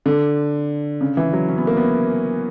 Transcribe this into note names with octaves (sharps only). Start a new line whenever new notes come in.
D3
C#3
E3
F#3
C#4
B3
A#3
B3